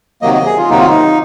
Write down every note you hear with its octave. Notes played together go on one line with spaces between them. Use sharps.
C3 D#3 F#3 A#3 D#5
D#5
G#4
F4
C3 D#3 F#3 A#3 D#4
F4
D#4